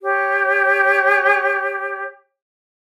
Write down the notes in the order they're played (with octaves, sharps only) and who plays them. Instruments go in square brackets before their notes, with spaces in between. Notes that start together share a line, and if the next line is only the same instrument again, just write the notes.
[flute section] G4 C#5